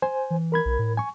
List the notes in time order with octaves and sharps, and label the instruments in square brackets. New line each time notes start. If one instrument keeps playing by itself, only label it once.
[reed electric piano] C5 G#5
[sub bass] E3
[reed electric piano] A#4 B5 G#6
[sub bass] B1
A2
[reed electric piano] G#5 C#6